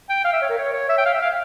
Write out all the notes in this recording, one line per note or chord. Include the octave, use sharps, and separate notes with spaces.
G5
F5
E5
C#5
A#4
C#5
C#5
E5
G5
F5
E5
F5